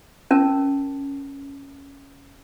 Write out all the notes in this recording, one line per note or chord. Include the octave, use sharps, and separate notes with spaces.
C#4 A#4 A5